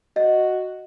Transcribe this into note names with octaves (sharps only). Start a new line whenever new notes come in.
F#4 D#5